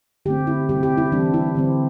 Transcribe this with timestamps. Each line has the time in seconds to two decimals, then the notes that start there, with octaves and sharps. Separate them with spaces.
0.25 D3 A3 C4 G4
0.47 E4
0.69 C3 G3 C4 G4
0.83 G4
0.98 E4
1.12 E3 G3 C4 D4
1.34 E4
1.55 D3 G3 C4